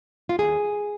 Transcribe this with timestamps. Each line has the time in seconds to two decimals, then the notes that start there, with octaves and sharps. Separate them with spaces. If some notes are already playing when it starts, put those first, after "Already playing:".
0.29 F4
0.38 D#2 G#4